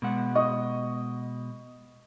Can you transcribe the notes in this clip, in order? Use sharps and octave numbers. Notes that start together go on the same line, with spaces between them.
B2 G#3 F#5
D#5 C#6 D#6